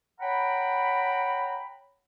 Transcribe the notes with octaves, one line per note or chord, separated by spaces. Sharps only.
C#5 F#5 G5 A#5 B5